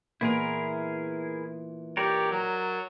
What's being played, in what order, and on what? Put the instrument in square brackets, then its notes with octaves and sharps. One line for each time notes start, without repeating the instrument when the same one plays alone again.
[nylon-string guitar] A#2 E3 B3 [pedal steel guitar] E4 G#4 A#4
[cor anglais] G4 [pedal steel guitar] A#4 C#5 D5
[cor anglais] F#3